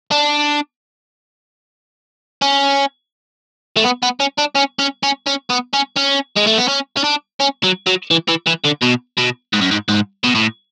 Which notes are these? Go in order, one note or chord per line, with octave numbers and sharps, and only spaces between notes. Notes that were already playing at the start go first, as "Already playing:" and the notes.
D4
C#4
A3
B3
B3
C#4
D4
C#4
C#4
C#4
C#4
B3
C#4
C#4
G#3
A3
B3
C#4
C#4
D4
C#4
F#3
F#3
E3
E3
E3
D3
B2
B2
G#2
F#2
G#2
G#2
B2
A2